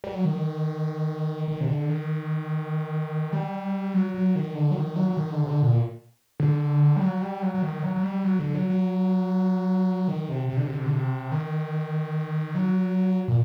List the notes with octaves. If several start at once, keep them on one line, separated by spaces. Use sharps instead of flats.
G3
F#3
D#3
D#3
C3
D3
D#3
G3
F#3
F#3
D#3
D3
F#3
D#3
F#3
F#3
D#3
D3
C3
D3
A#2
D3
G3
F#3
G3
F#3
F#3
D#3
F#3
F#3
G3
F#3
D3
F#3
F#3
D#3
C3
C3
D3
C3
D3
C3
D3
C3
D#3
F#3
A#2